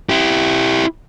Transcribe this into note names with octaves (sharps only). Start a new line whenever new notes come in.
E4 G4